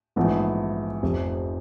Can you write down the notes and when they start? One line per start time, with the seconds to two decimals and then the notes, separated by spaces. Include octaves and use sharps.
0.16 A#1 G#2 E3 A3 B3
1.03 F1 F2 C3